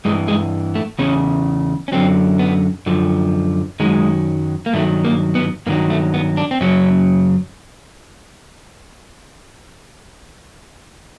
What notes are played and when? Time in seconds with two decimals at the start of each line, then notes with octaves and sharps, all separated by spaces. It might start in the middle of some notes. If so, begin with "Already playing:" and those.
0.05 G2 E3 G#3
0.28 G#3
0.75 A3
0.99 E2 C#3 C#4
1.88 C#4
1.92 F#2 D3 F#3 C4
2.39 B3
2.86 F#2 D3 F3
3.80 F#2 D#3 F#3 G#3
4.66 A#3
4.73 G2 D#3 F#3 A3
5.05 A#3
5.35 B3
5.66 G2 D#3 F#3 A#3
5.90 A3
6.14 B3
6.37 D4
6.51 C4
6.61 F#2 C#3 F#3 C#4